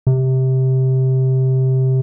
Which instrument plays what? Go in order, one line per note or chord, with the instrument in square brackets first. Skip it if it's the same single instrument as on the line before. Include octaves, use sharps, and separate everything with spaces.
[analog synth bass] C3